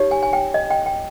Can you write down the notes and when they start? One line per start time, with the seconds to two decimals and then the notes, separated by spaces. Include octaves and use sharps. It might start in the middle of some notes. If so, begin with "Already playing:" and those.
Already playing: D#4 G4 C#5
0.11 G#5
0.23 G#5
0.33 G5
0.54 D#5
0.70 G5
0.86 G5